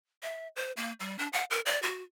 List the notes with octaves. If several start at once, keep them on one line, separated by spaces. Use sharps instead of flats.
E5
C5
A#3
G3
D4
F#5
A#4
D5
F#4